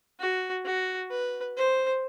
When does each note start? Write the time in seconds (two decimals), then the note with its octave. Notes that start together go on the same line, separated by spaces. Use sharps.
0.19 F#4
0.65 F#4
1.11 B4
1.57 C5